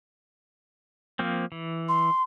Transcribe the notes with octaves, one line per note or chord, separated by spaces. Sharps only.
F3 A#3 C4
E3
C6